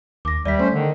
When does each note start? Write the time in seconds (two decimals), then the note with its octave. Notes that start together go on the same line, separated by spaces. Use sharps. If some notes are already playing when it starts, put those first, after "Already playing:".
0.25 D#2 D6 A#6
0.45 D#2 G3 D5 E5 B6
0.59 A3 C#4 C5
0.73 D3 D#3